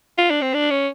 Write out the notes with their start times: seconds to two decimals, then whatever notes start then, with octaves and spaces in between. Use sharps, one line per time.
0.18 F4
0.30 D4
0.42 C4
0.54 D4
0.71 C#4